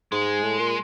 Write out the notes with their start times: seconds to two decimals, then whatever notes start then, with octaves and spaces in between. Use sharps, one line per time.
0.12 G#2 G#3
0.43 A2
0.59 A#2